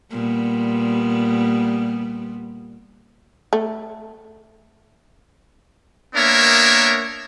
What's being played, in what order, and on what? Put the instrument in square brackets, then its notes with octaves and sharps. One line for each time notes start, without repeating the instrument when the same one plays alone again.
[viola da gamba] A#2 G3 B3
[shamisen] A3
[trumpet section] A#3 B3 D4 A#4 C#5 E5